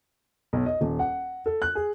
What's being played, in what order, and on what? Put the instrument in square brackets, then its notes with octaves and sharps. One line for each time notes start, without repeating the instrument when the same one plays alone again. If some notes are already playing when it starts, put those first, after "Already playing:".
[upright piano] B1
D#5
D#1
F#5
A4
F#6
G#4